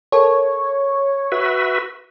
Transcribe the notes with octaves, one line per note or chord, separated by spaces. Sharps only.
A4 A#4 C#5 A5
F#4 B4 E5